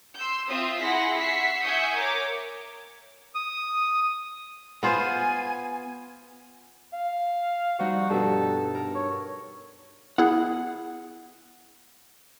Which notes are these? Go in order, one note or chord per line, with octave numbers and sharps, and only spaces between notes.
C6 E6 G6
C4 F4 E5 C6 D#6
E4 G#4 F#5 C6 A#6 B6
E5 F#5 C#6 B6 C7
E5 F#5 G#5 C#6 D#6 G6
A#4 C#5 D6
D#6
B3 F4 C5 G#5
F5
F3 G3 D#4 F#4
G2 B2 A4
A#4
C#5
B3 E4 G#4 F#5